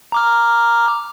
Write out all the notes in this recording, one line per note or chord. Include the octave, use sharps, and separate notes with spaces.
A#5 D6 F6